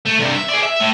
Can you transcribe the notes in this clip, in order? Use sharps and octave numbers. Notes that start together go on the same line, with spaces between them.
A3
G2 C3
E5
G#4 D5
E5
A2